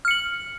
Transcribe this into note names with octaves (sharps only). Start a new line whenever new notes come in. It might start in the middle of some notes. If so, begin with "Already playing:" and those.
F6 C#7 F#7